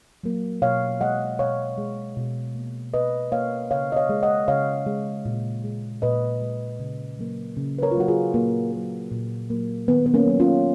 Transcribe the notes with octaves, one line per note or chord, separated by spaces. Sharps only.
F#3 A#3
B2 C#5 F5
G#3 D#5 F#5
B2 C#5 F5
G#3
B2
A#3
B2 B4 D#5
A#3 C#5 F5
C#3 C#5 F5
D#5
C#5 F5
G#3
D#5 F#5
C#3 C#5 F5
G#3
A#2
G#3
A#2 B4 D#5
G#3
C#3
F#3 A#3
C#3
B4
A#4 C#5
F4
F#3 A#3 F#4
F4 G#4
A#2 A#3
F#3 A#3
A#2
F#3 A#3
D#3 B3
B3
A#3 C#4
F#3 A#3
C#4 F4